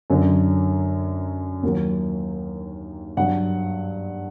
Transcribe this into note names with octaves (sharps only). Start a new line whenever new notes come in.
F#2 D3 F#3
D#2 D#3 F#3
G2 F#3 F#5